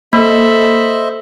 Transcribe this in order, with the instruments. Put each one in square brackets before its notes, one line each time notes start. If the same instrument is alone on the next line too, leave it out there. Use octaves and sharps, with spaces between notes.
[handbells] A#3 [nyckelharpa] A4 B5 [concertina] C5 D#5 E5